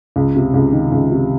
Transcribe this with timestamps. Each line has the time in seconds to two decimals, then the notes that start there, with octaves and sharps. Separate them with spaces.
0.16 C#2
0.36 C3
0.54 C#2
0.72 D#3
0.92 C#2
1.11 C3